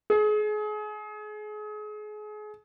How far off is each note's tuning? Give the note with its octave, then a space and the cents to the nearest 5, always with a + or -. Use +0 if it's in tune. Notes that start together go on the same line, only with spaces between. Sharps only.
G#4 +30